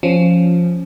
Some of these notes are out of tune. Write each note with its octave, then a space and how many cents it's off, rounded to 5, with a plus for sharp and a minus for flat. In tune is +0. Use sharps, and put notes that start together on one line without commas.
F3 +0 C#4 +0